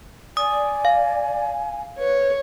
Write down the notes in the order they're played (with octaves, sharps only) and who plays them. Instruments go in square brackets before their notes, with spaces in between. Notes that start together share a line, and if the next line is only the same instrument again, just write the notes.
[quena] D5 [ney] G#5 [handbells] D#6
[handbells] F5
[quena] B4 [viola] C#5